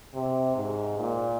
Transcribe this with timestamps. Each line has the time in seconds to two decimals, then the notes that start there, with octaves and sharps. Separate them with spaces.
0.14 C3
0.56 G#2
0.99 A#2